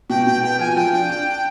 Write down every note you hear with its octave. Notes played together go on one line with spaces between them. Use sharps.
B2 G5
B2 G5
B3 G5
F3 G#5
F3 G5
D4 G5
D4